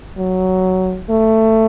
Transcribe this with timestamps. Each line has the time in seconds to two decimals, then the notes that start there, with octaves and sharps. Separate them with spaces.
0.17 F#3
1.09 A3